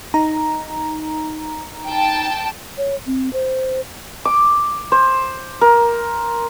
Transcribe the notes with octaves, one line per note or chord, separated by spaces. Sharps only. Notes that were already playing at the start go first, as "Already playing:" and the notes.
D#4 A#5
G5 A5
C#5
C4
C5
D6
C5
A#4